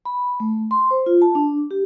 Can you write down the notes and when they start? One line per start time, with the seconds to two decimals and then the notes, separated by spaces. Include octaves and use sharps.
0.05 B5
0.40 A3
0.71 C6
0.91 C5
1.06 F4
1.22 A5
1.35 D4
1.71 G4